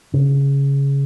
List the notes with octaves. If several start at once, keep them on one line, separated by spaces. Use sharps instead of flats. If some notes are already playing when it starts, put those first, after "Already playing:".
C#3